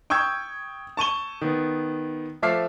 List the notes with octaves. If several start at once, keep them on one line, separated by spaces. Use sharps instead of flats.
G5 C#6 D#6 E6 G6 G#6
A5 C#6 D#7 G7
D#3 B3
F3 A3 E5 D6 F6 C7